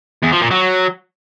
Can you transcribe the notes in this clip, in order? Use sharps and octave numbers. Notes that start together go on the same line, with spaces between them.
E2
F3
A#2
F#3